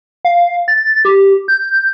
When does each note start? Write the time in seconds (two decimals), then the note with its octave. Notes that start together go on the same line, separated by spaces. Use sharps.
0.25 F5
0.68 A6
1.05 G4
1.48 G6